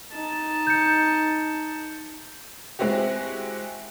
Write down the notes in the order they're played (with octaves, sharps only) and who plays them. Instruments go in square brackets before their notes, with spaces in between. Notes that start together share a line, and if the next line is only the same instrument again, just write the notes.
[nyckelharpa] D#4 A5
[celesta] G6 C#7
[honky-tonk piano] G#3 C4 E4 F#4 G4